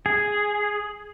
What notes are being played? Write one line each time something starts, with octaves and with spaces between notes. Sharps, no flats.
G#4